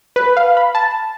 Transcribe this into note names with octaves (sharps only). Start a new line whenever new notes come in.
B4
F5
B5
A5